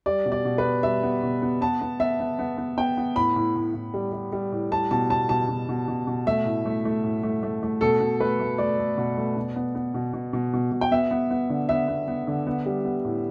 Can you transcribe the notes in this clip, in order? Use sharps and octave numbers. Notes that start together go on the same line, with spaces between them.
G3 D5
B2
D5
B2
B4
B3
G3 E5
B3
B2
B3
B3 A5
B3
B3 E5
B3
B3
B3
B3 G5
B3
A2 B5
A2
A2
A2
G3
G3
G3
A2
G3 A5
B2 A5
B3 A5
B2 A5
B2
B2
B2
B2
A3 E5
A2
A3
A3
A2
A3
A3
A3
B2 A4
B2
A3 B4
A3
A3 D5
A3
B2
A3
B2
B3
B3
B2
B2
B2
B2
B2
G5
B3 E5
B3
B3
D3
B3 E5
B3
B3
D3
B3
G3
B3
A2